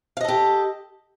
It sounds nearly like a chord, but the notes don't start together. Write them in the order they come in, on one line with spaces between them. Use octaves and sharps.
F5 D#5 A4 G4